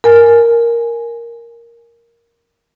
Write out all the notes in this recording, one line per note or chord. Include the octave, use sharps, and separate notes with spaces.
A#4 G#5